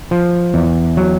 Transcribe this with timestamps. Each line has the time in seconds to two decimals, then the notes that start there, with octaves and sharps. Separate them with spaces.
0.11 F3
0.54 E2
0.97 F#3